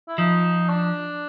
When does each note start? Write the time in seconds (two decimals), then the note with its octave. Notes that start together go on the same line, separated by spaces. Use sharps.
0.08 E4
0.18 F3 D#4
0.69 D4